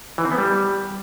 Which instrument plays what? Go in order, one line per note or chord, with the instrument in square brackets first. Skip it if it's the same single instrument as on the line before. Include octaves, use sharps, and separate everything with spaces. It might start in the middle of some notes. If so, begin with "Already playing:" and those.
[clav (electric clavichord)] E3
C4
B3
G3